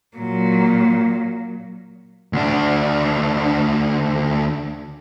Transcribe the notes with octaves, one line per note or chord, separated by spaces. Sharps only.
A#2 F#3
D2 D4